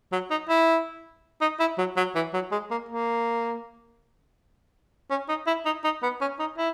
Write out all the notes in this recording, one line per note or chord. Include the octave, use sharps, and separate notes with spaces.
F#3
D#4
E4
D#4
E4
F#3
F#3
E3
F#3
G#3
A#3
A#3
C#4
D#4
E4
D#4
D#4
B3
C#4
D#4
E4